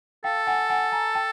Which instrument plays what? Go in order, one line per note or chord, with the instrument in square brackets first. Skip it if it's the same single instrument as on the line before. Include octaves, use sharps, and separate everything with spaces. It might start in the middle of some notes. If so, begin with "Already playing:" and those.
[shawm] A4 [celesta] F5 G5
[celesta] F#5 G#5
F#5 G#5
G#5 A#5
G5 A5